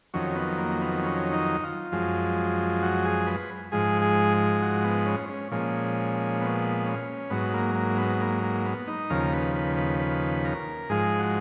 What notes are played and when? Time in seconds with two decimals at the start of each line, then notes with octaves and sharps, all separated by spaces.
0.14 F2 D#3 F#3 C#4
0.35 B3
0.58 A#3
0.81 B3
1.03 C#4
1.33 D#4
1.63 F4
1.92 F#2 F3 G#3
2.82 F#4
3.05 G#4
3.27 B4
3.72 G#2 F3 G#3 G#4
4.02 G#4
4.62 F#4
4.84 B3
5.06 C#4
5.29 C#4
5.51 A#2 F3 G#3 C#4
6.41 B3
6.86 C#4
7.30 G#2 F#3 B3
7.54 A#3
7.75 A#3
7.98 B3
8.21 A#3
8.43 A#3
8.66 B3
8.87 D#4
9.10 D#2 C#3 F3 A#4
9.33 B4
9.55 B4
9.77 B4
9.99 B4
10.45 A#4
10.89 G#2 F3 G#3 G#4
11.19 F#4